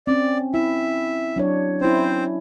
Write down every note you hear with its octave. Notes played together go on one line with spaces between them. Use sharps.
C4 C#4 D5
E4 E5
F#3 D4 C#5
C4 C#4 E4 C5